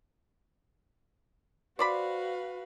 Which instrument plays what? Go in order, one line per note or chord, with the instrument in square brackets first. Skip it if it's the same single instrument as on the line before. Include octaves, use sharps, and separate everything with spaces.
[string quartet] F#4 B4 F5 [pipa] C5 D5 B5